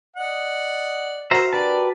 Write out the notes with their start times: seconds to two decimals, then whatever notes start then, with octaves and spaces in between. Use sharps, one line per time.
0.16 D5 D#5 F#5
1.31 F#4 A#4 C5 E5 A#5
1.53 D4 G4 B4 D5 A5